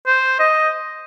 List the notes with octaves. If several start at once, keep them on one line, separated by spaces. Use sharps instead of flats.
C5
D#5